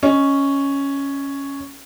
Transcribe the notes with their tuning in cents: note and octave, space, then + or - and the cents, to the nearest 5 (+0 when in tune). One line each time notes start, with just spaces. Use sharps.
C#4 +0 D#5 +0